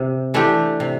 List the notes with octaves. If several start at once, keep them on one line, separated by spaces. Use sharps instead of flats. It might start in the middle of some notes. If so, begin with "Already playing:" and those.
Already playing: C3
E3 A3 D4 G4
C3